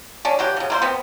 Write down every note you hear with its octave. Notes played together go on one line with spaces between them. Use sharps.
C#4 D4
E3 F#3 G4
C#3 F3
A#3 E4 C5
B3 C4